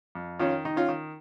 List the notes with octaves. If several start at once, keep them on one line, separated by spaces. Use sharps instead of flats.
F2
D#3 C#4 F4
D#3 D#4
C#4 F4
D#3